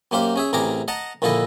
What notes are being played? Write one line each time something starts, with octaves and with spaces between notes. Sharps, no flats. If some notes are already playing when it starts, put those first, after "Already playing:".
F#2 A#3 G4 C5 F5
C#4 G#4 E5
A1 C3 G#4 A#4 A#5 D6
D#5 F#5 A5 A#5
A#1 A#2 D3 E4 A4 D#5